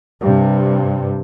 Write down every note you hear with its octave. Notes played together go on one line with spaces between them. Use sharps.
G2 C3